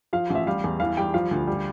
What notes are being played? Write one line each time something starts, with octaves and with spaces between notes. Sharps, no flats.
F3 F5
A1
E5
G3 F5
E2
E3 F5
G3 G5
F3 F5
D2
G3